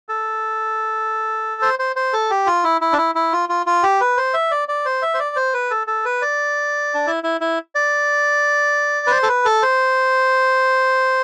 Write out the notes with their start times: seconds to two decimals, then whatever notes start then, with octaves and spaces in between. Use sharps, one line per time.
0.09 A4
1.62 C5
1.79 C5
1.96 C5
2.13 A4
2.30 G4
2.47 F4
2.64 E4
2.81 E4
2.92 D4
2.98 E4
3.15 E4
3.32 F4
3.49 F4
3.66 F4
3.83 G4
4.01 B4
4.17 C5
4.34 E5
4.51 D5
4.68 D5
4.85 C5
5.02 E5
5.14 C5
5.19 D5
5.36 C5
5.54 B4
5.71 A4
5.87 A4
6.05 B4
6.22 D5
6.95 D4
7.07 E4
7.24 E4
7.41 E4
7.75 D5
9.07 B4
9.11 C5
9.23 A4
9.29 B4
9.45 A4
9.62 C5